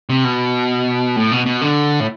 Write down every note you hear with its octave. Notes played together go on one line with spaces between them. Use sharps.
C3
B2
A2
B2
B2
D3
A2